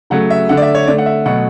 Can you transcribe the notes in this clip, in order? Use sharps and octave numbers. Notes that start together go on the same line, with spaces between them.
C#3 F#3 A3 F#5
E5
D3 A3 F#5
D5
E5
C#5
D3 A3 D5
F#5
E5
B2 F#3 A3 F#5